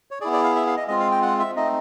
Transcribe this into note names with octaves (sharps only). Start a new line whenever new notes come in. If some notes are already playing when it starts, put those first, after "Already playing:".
C#5
B3 E4 G#4 D5
D5
F5
E5
F5
D#5
G#3 C4 F4 D#5
F5
G5
F#5
E5
A3 C4 D#4 D#5